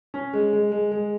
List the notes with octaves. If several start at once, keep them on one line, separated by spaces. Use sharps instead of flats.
C#4
G#3
G#3
G#3
G#3